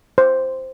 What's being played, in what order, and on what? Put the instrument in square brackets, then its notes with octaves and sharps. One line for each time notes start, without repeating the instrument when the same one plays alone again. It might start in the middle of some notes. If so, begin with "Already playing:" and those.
[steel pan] C5